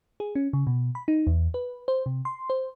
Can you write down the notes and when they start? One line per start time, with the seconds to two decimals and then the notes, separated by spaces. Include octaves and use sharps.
0.20 G#4
0.35 C#4
0.53 C#3
0.67 B2
0.95 B5
1.08 D#4
1.27 E2
1.54 B4
1.88 C5
2.06 C3
2.25 C6
2.50 C5